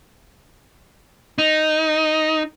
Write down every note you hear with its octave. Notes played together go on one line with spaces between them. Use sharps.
D#4